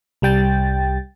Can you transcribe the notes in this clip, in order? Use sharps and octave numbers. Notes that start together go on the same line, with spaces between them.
C2 G3 G5 A6